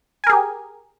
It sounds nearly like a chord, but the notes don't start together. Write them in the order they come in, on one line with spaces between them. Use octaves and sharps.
G#5 A#4 G#4 G4